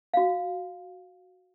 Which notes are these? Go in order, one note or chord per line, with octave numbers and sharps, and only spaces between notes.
F#4 F5